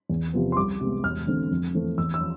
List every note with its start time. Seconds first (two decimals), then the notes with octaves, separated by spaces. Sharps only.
0.09 E2
0.33 C3 F3 B3
0.52 C6
0.57 C2 D6
0.81 C3 G#3 B3
1.04 E1 F6
1.27 E2 D3 A3 C4
1.51 F2
1.75 E3 A3 C4
1.98 E2 E6
2.14 E6
2.21 F3